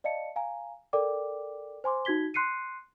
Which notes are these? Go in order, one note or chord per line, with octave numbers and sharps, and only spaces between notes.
D5 D#5 F5 A5 C#7
F5 G#5 A#5
A4 A#4 D5 G5 D6
C5 G#5 C6 D6
D#4 F#4 G#6 B6 G7
C6 F#6 C7 C#7 D#7